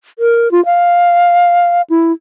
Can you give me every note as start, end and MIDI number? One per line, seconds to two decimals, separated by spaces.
0.19 0.51 70
0.51 0.63 65
0.65 1.82 77
1.90 2.12 64